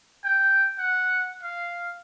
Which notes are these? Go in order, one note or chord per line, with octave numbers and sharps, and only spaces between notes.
G5
F#5
F5